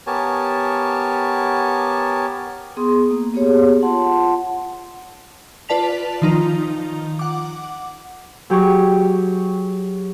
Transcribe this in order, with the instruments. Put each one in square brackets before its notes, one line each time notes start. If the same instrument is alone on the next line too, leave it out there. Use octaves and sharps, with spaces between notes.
[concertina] B3 G4 A#4 C#5 G#5 A5
[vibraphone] B3 G#4 C6 D#6
A#3
B3 G4 G#4 C#5
F4 F#5 A5 C6
[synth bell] F4 B4 D5 A5 B6 F7
D#3 F3 D#4 F4 A#5
F#5 D6
[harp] F#3 G4 G#4 C#6